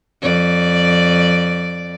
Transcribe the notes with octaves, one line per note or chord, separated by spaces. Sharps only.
F2 D5